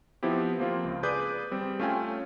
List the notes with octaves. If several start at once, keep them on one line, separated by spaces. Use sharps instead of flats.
F3 B3 C4 E4 G4
F3 A#3 C4 F4
C#2
G#4 B4 D5 D6 D#6 G6
G3 C4
A3 C#4 F4 G5 G#5